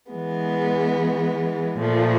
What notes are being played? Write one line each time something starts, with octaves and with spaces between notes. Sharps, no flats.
E3 G#3 B3
A#2 F3 A3